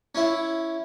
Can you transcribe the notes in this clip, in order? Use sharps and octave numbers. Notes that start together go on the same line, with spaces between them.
C#4 E4